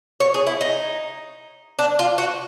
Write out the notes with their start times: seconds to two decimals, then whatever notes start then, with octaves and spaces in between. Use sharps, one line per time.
0.20 C#5
0.34 G#4
0.47 E4
0.61 D#4
1.79 D4
1.99 F4
2.18 F#4